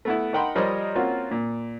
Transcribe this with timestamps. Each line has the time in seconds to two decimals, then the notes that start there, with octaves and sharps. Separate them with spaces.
0.05 A3 B3 E4
0.33 D#4 A#4 F#5 G5 B5 C6
0.55 F3 G3 A#4 C5 C#5 D#5
0.95 A#3 C4 C#4 F4 F#4
1.31 A#2